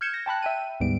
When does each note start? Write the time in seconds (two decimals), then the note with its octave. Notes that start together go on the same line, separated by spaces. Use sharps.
0.01 F6 G6 G#6 C#7 E7
0.14 A#6
0.26 G5 A5 B5 F#6
0.42 E5 G5 D#7
0.80 D2 G#2 G3 B3 D7